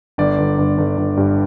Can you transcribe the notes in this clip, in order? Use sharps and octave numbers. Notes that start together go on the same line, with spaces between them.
G1 D5
G1
G1
G1
G1
G2